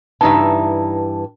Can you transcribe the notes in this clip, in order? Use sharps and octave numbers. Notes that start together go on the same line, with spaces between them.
G2 C#3 E3 D#4 E5 A5